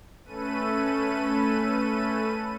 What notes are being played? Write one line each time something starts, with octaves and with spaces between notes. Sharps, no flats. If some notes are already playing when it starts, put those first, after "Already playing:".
A3 C#4 A4 B4 D#7